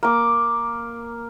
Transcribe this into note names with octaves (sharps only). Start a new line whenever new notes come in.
A#3 D6